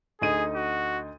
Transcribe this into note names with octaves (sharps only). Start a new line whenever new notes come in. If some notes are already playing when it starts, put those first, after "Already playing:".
D2 D#4 G#4 D#7
F#4